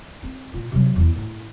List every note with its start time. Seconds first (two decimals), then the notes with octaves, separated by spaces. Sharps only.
0.23 C4
0.53 A#2 F4
0.72 C3 F#3
0.96 E2 E4
1.15 A2